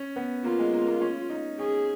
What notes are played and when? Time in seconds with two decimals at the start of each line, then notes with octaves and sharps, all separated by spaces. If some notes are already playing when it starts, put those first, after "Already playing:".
Already playing: C#4
0.16 B3
0.44 A#3 F4
0.59 G#3
0.73 A#3
0.87 A#3
1.01 C#4
1.30 D#4
1.58 C#4 G#4